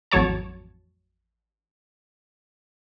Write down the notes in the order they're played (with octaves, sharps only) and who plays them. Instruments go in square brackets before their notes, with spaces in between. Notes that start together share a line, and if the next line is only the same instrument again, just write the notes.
[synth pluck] A1 F2 F#3 C#5 A5